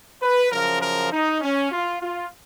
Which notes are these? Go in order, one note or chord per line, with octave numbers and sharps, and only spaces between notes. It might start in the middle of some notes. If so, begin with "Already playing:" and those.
B4
F#2 C#3 F3 A#4
A#4
D#4
C#4
F4
F4